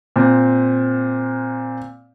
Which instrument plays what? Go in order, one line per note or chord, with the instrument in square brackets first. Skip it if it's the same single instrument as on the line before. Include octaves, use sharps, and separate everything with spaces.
[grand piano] A#2 C4